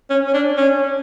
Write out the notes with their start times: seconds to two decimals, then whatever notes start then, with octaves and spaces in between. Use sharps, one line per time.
0.10 C#4
0.28 C#4
0.34 D4
0.57 C#4